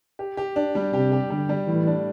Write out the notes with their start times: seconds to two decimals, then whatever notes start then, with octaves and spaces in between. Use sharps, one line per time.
0.19 G4
0.37 G4
0.56 D4
0.75 G3
0.93 C3 G4
1.12 G4
1.30 D3 G3
1.49 G3
1.67 A2 E3
1.87 D4